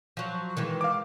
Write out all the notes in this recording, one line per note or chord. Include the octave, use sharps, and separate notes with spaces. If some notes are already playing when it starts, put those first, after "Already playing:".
F3 F#3
D#3 E3 G#3
F5 D6